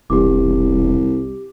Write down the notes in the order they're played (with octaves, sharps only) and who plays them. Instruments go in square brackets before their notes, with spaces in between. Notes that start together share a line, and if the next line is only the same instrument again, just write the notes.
[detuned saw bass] E1 [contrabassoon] C2 [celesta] G4 D6